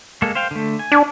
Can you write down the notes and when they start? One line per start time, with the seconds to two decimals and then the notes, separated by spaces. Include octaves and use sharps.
0.22 G#3 A#3 A4
0.35 C5 F5 G5
0.51 D3 A3
0.79 G#5
0.92 D4